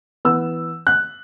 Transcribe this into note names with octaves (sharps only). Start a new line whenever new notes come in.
E3 B3 E6
F#6